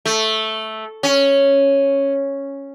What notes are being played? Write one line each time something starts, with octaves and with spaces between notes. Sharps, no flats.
A3
C#4